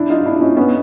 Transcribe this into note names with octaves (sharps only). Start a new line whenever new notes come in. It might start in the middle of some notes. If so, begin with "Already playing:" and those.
Already playing: D4 E4
D#4 F4
D4 E4
C#4 D#4
B3 C#4